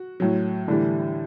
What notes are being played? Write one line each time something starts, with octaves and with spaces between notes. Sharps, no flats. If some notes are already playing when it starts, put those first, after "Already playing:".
Already playing: F#4
A2 F#3
A2 D3 E3 G3 D4